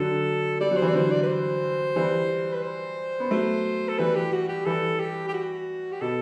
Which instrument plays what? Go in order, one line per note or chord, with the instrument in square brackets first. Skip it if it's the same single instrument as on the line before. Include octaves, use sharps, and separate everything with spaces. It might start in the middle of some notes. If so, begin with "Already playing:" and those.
Already playing: [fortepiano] D3 F#3 [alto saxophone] A4
[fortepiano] G3 [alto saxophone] D5
[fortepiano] F#3
[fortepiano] E3 [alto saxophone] C5
[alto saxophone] D5
[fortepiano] D3 F#3 [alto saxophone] C5
[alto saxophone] D5
B4
C5
[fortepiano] E3 G3
[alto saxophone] B4
C5
[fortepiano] B3
F#3 A3
[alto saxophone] A4
[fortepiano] E3 G3 [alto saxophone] B4
[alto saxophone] G4
F#4
G4
[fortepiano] E3 G3 [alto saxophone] A4
[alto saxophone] G4
G4
F#4
G4
[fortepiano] B2 [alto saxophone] A4